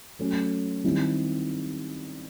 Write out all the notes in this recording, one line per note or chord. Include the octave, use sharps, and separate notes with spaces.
F#3 A3 C#4
D#3 G3 C4 E4